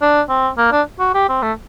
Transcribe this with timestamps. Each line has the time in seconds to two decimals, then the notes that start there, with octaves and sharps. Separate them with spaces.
0.01 D4
0.29 C4
0.58 A#3
0.72 D4
1.00 F#4
1.14 G4
1.29 C4
1.42 A3